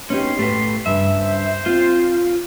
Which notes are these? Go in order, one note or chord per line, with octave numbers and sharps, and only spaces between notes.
B3 C#4 D#4 G4 C6
A2 A3 G4 B4
G2 C#3 G3 E5
C5
C4 F4